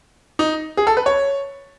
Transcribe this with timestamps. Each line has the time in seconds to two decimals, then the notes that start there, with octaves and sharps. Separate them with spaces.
0.39 D#4
0.77 G#4
0.87 A4
0.97 B4
1.06 C#5